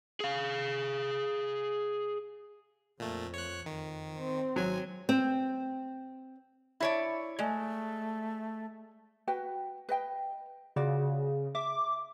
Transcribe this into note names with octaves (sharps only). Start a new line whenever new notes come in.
G#4 F5
F2 A#2 A3
C#5 F#6
F2 D#3
C4
G#1 F#3 G#5
C4
E4 C#5 D5 E5 A5
G#3 A3 D5 G#5
F#4 B4 G5
B4 D#5 G5
C#3 F4 F#4 D5
E5 D6